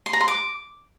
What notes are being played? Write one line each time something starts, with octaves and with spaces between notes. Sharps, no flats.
C6
A#5
C6
D6